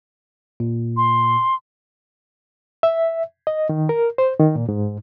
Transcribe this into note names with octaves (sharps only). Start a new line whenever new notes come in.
A#2
C6
E5
D#5
D#3
A#4
C5
D#3
A#2
G#2